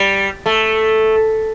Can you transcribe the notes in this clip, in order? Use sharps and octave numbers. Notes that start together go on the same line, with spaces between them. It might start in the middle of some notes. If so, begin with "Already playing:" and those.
Already playing: G3
A3